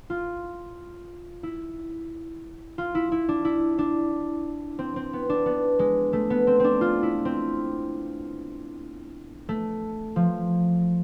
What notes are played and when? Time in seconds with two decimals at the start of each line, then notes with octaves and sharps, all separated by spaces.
0.10 F4
1.43 E4
2.78 F4
2.95 E4
3.12 E4
3.29 D4
3.45 E4
3.78 D4
4.79 C4
4.96 C4
5.13 B3
5.29 D4
5.46 B3
5.79 G#3
6.13 A3
6.30 B3
6.47 C4
6.60 C4 D4
6.81 F4
7.03 E4
7.25 C4
9.49 A3
10.16 F3